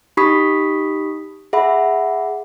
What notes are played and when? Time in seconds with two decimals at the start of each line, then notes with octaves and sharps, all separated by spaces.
0.17 D#4 G4 B5 C#6 D#6 B6
1.53 G#4 E5 F#5 B5